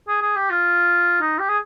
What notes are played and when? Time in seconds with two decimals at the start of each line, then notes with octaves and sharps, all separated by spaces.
0.08 G#4
0.22 G#4
0.36 G4
0.50 F4
1.20 D#4
1.39 G4
1.49 G#4